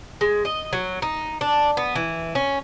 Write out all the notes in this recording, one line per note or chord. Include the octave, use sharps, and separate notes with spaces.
G#3
D#5
F#3
D#4
D4
B3
E3
C#4